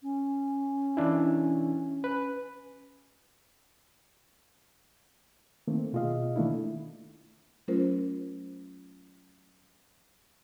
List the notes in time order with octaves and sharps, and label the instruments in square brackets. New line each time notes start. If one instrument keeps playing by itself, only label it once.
[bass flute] C#4
[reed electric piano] E3 D4 E4
B4
D#3 A3 A#3 C4
B2 F4 G#4 D#5 F5
D#3 A3 A#3 D4 E4
[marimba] F#3 A3 C#4 F4 A#4 C5